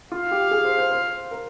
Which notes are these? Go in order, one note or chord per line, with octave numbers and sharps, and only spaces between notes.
F4 F5
G4
G#4
C5
C5
C5
A#4